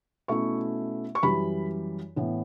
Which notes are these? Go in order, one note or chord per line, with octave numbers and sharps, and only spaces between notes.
B2 A3 C#4 E4 C#6
C#6
F#2 E3 G3 B5
A2 E3 B3